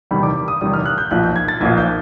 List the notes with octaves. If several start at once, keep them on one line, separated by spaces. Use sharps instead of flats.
E2 C3 D#3 G3 B5
D6
D#6
E2 C3 D#3 G3 D#6
F6
F#6
G6
B1 A#2 F3 F#6
G6
G#6
A6
B1 A#2 F3 G#6
G6